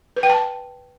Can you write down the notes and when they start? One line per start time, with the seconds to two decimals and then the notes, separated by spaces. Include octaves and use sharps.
0.16 B4
0.23 G5
0.30 A5